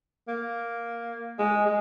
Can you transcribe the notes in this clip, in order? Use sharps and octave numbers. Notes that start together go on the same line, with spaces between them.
A#3
G#3
G#3